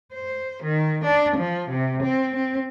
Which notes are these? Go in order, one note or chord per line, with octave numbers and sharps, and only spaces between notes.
C5
D#3
D4
F3
C3
C4
C4